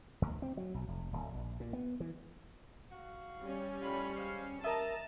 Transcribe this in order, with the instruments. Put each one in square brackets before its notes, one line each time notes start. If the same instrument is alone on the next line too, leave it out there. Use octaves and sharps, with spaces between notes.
[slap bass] D2
C4
F#3
B1
F1
D1
A#1
A#2
B3
E3
[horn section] F#4 F5
[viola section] G3 C#4
[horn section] A2 F4 B5
G#3 C5 F5
[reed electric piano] A#4 E5 [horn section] D#5 A#5 [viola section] A5